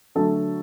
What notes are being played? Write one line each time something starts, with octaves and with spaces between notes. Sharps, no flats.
D3 F#3 A3 A4